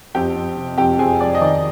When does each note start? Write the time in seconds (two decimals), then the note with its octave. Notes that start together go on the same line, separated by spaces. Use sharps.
0.15 F2 G4 G5
0.36 F2
0.57 C3
0.77 F2 G4 G5
0.99 F2 G#4 G#5
1.20 F2 D5
1.35 D#5
1.41 D#3 D5